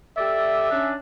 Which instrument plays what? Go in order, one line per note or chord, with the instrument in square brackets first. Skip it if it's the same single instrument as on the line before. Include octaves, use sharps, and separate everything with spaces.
[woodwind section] G4 A4 D5 [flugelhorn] E5
[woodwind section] C#4 D4